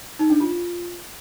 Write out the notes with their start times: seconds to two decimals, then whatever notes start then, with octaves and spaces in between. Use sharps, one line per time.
0.19 D#4
0.30 D4
0.40 F4